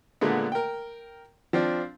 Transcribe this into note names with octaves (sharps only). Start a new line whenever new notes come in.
A#2 D3 G#3 A3 B3
A#4 G5
F3 C4 D4